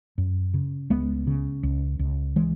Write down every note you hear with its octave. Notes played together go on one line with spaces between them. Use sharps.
F#2
C#3
C#2 G#3 B3
C#3
C#2
C#2
E3 G#3